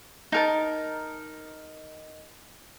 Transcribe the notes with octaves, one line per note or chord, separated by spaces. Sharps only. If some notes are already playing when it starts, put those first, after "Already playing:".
D#4 A#4 A5